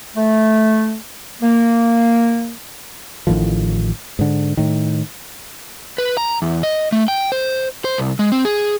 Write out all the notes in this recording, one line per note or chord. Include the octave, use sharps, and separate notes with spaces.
A3
A#3
A1 A2 D#3 F3
G#2 D3
A2 D#3
B4
A#5
E2
D#5
A3
G5
C5
C5
C2
G#3
C4
G#4